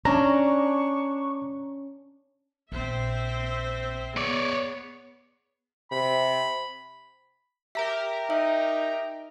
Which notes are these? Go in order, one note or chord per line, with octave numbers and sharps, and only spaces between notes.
C#4 D4 A#5 C#6
A#1 C4 C5 E5
B3 G#4 C#5 D5
C3 B5
G4 A#4 E5 A#5
D#4 E5